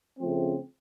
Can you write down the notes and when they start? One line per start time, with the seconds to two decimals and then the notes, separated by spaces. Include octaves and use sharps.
0.19 C#3 F3 A3 C4